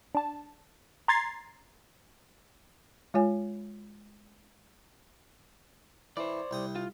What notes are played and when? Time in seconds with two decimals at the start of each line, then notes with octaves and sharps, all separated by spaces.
0.15 D4 A5
1.08 A#5 C6 G#6 A6 C7
3.14 G#3 F4 C#5 G#5
6.17 E3 C5 D5
6.51 C2 G5 D#6
6.76 F4